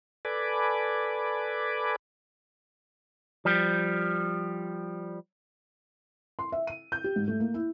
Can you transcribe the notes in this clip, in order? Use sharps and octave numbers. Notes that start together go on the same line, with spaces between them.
A4 B4 D5 G#5 B5 D6
F3 G3
C6
E5
D#7
G6
G4
G#2
A3
A#3
E4